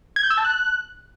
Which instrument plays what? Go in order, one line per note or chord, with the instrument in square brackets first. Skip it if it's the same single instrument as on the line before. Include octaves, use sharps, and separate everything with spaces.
[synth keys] G#6
G6
E6
A5
F#6